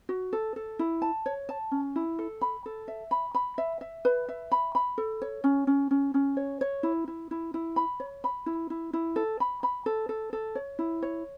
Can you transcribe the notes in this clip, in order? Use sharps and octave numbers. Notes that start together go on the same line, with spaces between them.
F#4
A4
A4
E4
A5
C#5
A5
C#4
E4
A4
B5
A4
E5
B5
B5
E5
E5
B4
E5
B5
B5
A4
C#5
C#4
C#4
C#4
C#4
C#5
C#5
E4
E4
E4
E4
B5
C#5
B5
E4
E4
E4
A4
B5
B5
A4
A4
A4
C#5
E4
C#5